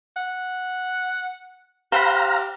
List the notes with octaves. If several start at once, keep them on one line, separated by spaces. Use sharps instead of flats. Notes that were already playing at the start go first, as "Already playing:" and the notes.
F#5
G4 C5 F5 F#5 A#5 B5